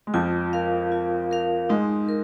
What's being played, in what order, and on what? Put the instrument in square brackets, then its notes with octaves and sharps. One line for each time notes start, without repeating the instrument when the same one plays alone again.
[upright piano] G#3
[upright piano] F2 F3 [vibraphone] F4
[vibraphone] A#4 F5
F4
A#4 F5
[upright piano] G#2 G#3 [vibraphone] D#4
[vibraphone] A#4